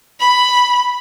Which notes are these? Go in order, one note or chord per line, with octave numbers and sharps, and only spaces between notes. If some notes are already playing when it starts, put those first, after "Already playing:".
B5